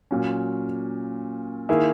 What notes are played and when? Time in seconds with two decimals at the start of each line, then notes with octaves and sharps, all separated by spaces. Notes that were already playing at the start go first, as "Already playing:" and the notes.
0.11 A#2 F#3 C#4
1.69 D#3 A#3 E4 G#4